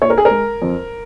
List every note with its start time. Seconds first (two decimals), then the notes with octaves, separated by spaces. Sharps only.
0.02 A#2 C#5
0.10 A#4
0.18 G#4
0.25 A#4
0.31 G#3
0.62 F2